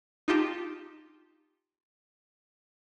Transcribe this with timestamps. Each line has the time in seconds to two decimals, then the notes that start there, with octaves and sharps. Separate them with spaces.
0.28 D#4 F4 G4 A5